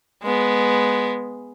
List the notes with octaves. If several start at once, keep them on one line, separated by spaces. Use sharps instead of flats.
G#3 B3